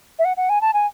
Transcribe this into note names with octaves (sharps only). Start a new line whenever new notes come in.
E5
F#5
F#5
G#5
A5
G#5